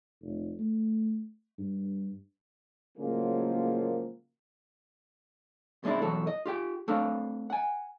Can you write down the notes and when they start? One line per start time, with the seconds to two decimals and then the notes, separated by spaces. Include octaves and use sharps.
0.21 F1
0.59 A3
1.58 G2
2.98 A2 C#3 F3 F#3 G#3 A#3
5.84 B2 G#3 C4 D4 E4
6.02 B2 E3 F#3 A4
6.27 D#5
6.46 F4 G4 G5
6.88 A3 C4 D4 A4 F5
7.50 F#5 G#5